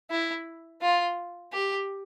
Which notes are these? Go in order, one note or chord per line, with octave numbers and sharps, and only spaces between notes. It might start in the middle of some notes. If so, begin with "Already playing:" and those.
E4
F4
G4